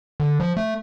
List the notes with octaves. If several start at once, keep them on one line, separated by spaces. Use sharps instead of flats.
D3
F3
A3